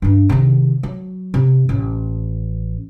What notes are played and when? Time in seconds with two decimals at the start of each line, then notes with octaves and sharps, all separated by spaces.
0.02 G2 D4
0.29 C3 D#3
0.83 F#3
1.34 C3
1.69 A1